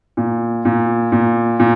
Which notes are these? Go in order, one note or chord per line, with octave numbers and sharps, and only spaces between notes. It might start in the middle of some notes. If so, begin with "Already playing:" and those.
A#2
A#2
A#2
A#2